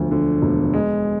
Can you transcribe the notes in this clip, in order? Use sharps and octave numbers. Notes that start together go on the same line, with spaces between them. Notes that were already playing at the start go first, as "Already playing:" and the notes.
Already playing: E1 D2 D3 F3
D3
E1
G#3